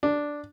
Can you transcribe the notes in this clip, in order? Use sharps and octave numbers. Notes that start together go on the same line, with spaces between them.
D4